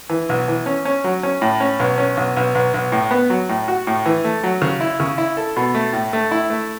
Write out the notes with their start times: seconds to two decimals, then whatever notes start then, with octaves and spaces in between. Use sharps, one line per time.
0.10 E3
0.29 B1
0.48 E3
0.66 C#4
0.85 C#4
1.04 F#3
1.23 C#4
1.42 A2
1.60 C#4
1.79 B1
1.98 C#4
2.17 B1
2.36 B1
2.55 B1
2.74 B1
2.92 A2
3.11 B3
3.30 F#3
3.49 A2
3.68 F#4
3.87 A2
4.06 E3
4.24 A3
4.43 F#3
4.62 C#3
4.81 E4
5.00 C#3
5.18 E4
5.37 A4
5.56 B2
5.75 A3
5.93 A2
6.13 A3
6.31 E4
6.50 A3